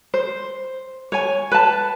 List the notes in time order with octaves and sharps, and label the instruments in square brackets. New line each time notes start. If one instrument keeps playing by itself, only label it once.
[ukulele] C5
C#5 G#5
B4 A5